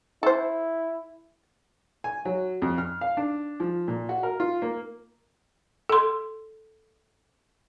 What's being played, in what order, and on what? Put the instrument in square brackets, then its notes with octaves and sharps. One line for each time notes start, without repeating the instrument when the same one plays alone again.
[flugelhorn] E4 [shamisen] A4 C5
[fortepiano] G#5
F#3
F2
F6
F5
D4
F3
A#2
F#4
A#4
F4
A#3
[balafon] A4 C6